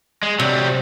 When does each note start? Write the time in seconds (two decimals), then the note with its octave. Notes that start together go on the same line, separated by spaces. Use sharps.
0.23 G#3
0.39 C3 F#3 G3